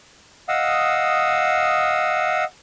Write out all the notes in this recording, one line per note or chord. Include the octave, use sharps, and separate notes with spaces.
D#5 F5 F#5 D#6 E6